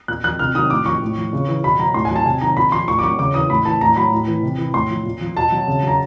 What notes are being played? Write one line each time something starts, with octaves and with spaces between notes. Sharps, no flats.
A#2 F#6
F3 F#6
C3 F6
D#3 F#3 D#6
A2 D6
F3 C#6
A2
F3
C#3
E3
B2 B5
F#3 A#5
A2 C6
G#5
F#3 A5
C3 G#5
D#3 F#3 A#5
A#2 B5
F3 C6
A2 C#6
D6
F#3 C#6
C#3 D6
E3 D#6
A2 B5
E3 A5
A2 A#5
F#3 B5
A2
E3
C3
E3
A2 C6
F3
A#2
F3
B2 A5
F#3
C#3
F#3 A#5